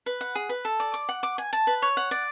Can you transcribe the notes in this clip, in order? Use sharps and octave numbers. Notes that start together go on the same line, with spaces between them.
B4
F#5
G#4
B4
A4
D5
D6
F#5
D6
G#5
A5
B4
C#5
F#5
D5